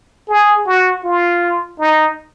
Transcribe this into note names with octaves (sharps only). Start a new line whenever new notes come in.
G#4
F#4
F4
D#4